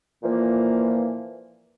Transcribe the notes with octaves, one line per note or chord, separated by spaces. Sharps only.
A#2 E3 F3 A#3